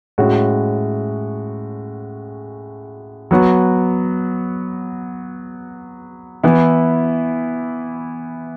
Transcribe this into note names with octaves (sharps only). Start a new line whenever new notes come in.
A2 G#3 C#4 F#4
F#3 B3 F#4
E3 B3 E4